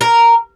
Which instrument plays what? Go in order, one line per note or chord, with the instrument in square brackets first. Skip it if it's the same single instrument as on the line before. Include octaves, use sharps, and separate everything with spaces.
[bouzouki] A#4